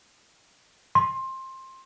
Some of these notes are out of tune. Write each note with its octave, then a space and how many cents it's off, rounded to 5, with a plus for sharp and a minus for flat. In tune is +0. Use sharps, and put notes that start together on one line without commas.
C6 +15